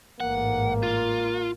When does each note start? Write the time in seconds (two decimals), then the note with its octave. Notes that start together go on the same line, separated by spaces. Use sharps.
0.20 A1 G#2 A#3 F#5
0.83 F4